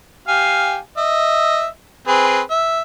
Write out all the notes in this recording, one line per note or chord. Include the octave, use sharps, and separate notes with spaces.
G4 F5 G#5
D#5 E5
C4 G#4 B4
E5